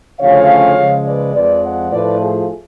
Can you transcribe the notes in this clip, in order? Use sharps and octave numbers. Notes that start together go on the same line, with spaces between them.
D2 C#3 F3 A3 C#4 C#5 F5
C#3 F3 G#3
B4 D5
F2 F3 G#3 B4 D5
D5 F#5
A2 F3 A3 B4 D5
F4 G#4